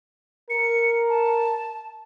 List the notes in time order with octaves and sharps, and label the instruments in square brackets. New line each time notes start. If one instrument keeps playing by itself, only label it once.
[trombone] A#4 [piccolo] C#7
[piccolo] A5